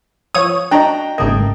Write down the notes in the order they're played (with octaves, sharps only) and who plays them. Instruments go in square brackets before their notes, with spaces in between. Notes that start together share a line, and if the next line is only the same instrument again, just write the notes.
[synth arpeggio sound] F3 C#5 D#7 [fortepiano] D#6
[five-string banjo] D4 F#4 D#5 [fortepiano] G5 A#5
[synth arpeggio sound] G#1 C#3 D#5 [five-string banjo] A3 A#3